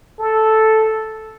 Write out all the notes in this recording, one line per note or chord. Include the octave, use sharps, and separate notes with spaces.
A4